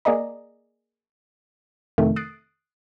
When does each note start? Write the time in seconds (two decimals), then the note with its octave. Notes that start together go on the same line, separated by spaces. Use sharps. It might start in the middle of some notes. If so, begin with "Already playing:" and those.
0.05 A#3 G#4 D5 D#5 A#5
1.98 F2 C3 D#3 A3
2.16 D#6 F#6 A6 C7 D7